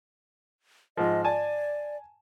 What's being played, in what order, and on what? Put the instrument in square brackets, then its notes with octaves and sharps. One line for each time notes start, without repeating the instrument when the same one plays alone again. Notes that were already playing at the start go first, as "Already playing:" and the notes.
[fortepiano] G#2 F3 [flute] D#5
[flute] D5 [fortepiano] G#5 A5